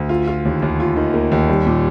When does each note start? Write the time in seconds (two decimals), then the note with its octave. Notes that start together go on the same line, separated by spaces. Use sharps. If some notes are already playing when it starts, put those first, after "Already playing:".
Already playing: D2
0.09 F4
0.27 F4
0.45 D#2
0.62 D#2
0.80 F4
0.96 D#3
1.14 A#3
1.32 D#2
1.49 G3
1.67 A#2